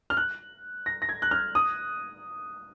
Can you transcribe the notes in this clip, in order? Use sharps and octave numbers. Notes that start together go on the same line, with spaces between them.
F6
F#6
A#6
A#6
G#6
F#6
F6
D#6